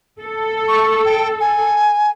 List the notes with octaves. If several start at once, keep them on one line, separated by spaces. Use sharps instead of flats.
A4
C#6
G5
G#5